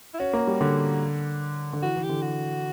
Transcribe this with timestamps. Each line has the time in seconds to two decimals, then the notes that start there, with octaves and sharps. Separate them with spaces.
0.14 E4
0.20 C#4 F#4
0.33 A#3
0.47 G3
0.61 D3
1.73 D3
1.83 E3 F#4
1.96 E3
2.03 G4
2.10 D3
2.22 F#4